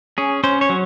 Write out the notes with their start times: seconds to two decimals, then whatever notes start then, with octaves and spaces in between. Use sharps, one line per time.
0.18 C#4 G#4
0.44 C#4 C5
0.61 C#5
0.70 F#3